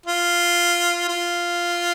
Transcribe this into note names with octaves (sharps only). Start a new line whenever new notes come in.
F4
F4